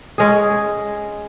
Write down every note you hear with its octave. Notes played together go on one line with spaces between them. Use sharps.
G#3 C#4 G#4